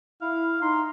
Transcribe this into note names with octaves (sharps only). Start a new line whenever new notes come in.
E4 F5
D#4 C6